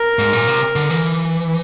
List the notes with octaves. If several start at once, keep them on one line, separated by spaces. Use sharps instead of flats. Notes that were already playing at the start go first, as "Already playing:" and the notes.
Already playing: A#4
G#2
A#2
C3
D3
E3